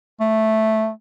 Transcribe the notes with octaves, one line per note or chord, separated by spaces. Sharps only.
A3